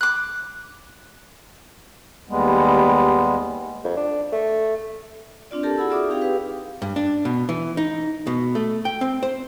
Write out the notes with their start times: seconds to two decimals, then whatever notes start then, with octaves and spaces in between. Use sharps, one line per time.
0.01 D6 F#6
2.29 D#2 G3 G#3 B3
3.84 F2
3.97 D4
4.32 A3
5.51 C4 D4 F4 D5
5.63 G4 A4 A#4 A5
5.78 E4 F#4 G#4 F#5 B5 E6
5.90 F4 G#4 D5 E5 D6 D#6
6.10 C4 D#4 G4 G#4 F5 G5
6.22 G4 G#4 B4 F5
6.82 G2
6.96 D4
7.25 B2
7.49 E3
7.77 D#4
8.27 B2
8.55 A3
8.85 G5
9.01 C4
9.23 C5